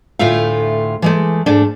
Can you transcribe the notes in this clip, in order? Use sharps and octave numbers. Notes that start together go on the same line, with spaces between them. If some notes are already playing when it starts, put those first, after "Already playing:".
D2 A2 A3 F4 E5 F5
E3 G#3 A3
G#2 A3 D4